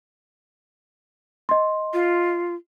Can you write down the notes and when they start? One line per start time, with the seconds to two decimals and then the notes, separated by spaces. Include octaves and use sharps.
1.49 D#5 C6
1.93 F4